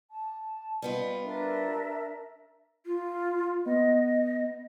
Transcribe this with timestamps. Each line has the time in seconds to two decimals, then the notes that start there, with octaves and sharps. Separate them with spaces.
0.11 A5
0.82 G3 B3 F4 D#5
1.23 D4 A#4 B4 E5
2.86 F4
3.66 B3 D#5